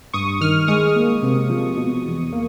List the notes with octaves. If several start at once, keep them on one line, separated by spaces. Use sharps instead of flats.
G2 C#6 D#6
D#3 D#6 F6
G#3 C#6 D#6
A#3
C3
F3
B2
E2
A#3